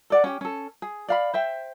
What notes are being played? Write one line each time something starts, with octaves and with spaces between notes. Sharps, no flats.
A4 D5 F#5
C#4 G4
C#4 A4
G#4
D5 F5 B5
C5 E5 G5